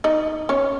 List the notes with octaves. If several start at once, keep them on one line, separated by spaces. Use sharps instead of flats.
D#4 D#5
C#4 C#5